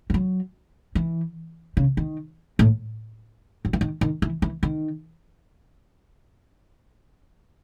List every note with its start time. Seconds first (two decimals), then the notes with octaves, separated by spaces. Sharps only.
0.10 E3
0.14 F#3
0.95 E3
1.77 C#3
1.97 D#3
2.59 A2
3.65 F#3
3.73 E3
3.81 D#3
4.01 D#3
4.22 E3
4.42 E3
4.63 D#3